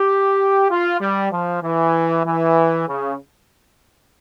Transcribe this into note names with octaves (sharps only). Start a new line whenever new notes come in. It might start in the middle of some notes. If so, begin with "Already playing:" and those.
Already playing: G4
F4
G3
F3
E3
E3
C#3